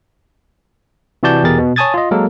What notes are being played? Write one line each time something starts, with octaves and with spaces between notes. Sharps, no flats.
C3 E3 F#4 D5 A5 G6
E2 B2 G4 G#4 A#4 A6
B2
C#5 G#5 A5 D#6 G#6 A6
F4 D#5
F#3 G#3 A#3 A4 A#4